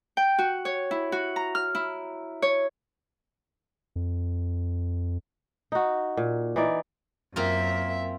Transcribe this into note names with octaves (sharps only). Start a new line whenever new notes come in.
G5
F#4
C#5
E4
F#4
A#5
F6
E4
C#5
F2
D#4 F#4
A#2
E3 D#4 D5
F#2 A#3 C4 F4 E5